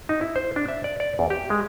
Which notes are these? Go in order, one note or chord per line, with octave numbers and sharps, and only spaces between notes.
D#4
E4
C5
D4
E5
D5
D5
E2
G4
G#3